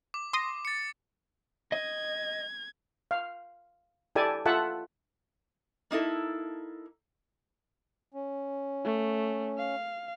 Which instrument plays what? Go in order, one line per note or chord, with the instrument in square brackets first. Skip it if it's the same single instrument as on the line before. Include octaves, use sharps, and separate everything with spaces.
[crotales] D6
[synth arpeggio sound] C6 D#6 A#6
[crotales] A6 C#7
[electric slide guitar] D#5 [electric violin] G#6
[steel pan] F5
E4 G4 A4 D5 G#5 A5
F4 A4 E5 F#5 A5
[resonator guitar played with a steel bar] A#3 D#4 E4 A4
[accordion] C#4
[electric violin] A3
F5